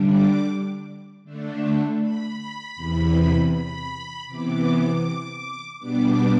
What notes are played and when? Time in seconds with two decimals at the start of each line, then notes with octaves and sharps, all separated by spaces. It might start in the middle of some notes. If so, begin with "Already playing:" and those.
Already playing: D3 G3 D4
0.10 D6
1.24 D3 A3 D4
2.00 B5
2.76 E2 C3 E3
3.52 B5
4.27 C3 E3 B3 D6
5.79 B2 G3 B3 D4 D6